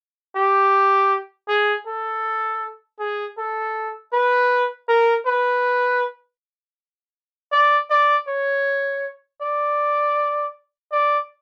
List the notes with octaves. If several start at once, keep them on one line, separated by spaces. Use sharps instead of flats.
G4
G#4
A4
G#4
A4
B4
A#4
B4
D5
D5
C#5
D5
D5